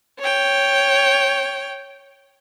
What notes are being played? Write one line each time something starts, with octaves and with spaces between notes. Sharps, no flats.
C#5 G5